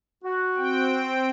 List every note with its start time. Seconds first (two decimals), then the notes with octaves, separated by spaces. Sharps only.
0.23 F#4
0.57 C4 G5